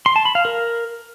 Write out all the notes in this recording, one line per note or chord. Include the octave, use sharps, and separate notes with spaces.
C6
A5
B5
F5
A#4